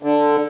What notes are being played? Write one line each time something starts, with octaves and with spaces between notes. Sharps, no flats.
D3